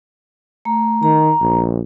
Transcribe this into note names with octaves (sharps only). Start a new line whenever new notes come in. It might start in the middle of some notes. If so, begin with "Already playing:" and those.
A3 A#5
D#3 A#5
A#1